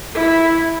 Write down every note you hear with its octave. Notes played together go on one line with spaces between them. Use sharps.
E4